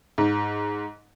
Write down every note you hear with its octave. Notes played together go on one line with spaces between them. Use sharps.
G#2